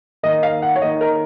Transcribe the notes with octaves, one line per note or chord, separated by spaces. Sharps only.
D#3 A#3 D#4 D#5
F5
F#5
C#5
D#3 A#3 D#4 D#5
A#4